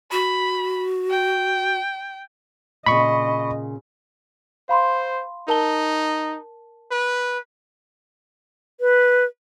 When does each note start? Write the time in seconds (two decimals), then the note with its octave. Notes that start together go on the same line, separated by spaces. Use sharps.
0.12 F#4 B5
1.10 G5
2.86 A#2 C#3 D#5 B5 C#6
4.69 C5 F5 B5 C6
5.48 D#4 A#4 A5 G7
6.91 B4
8.81 B4